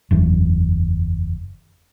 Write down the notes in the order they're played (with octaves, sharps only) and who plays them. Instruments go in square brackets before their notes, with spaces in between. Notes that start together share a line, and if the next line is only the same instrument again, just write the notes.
[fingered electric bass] F#1 E2